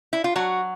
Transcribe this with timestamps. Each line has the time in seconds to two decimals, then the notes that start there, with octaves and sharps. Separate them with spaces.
0.13 E4
0.24 F4
0.36 F#3 F#4